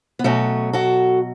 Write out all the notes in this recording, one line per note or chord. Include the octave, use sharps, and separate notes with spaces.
B3
B2 F#3 A3 C#4
F#4 A4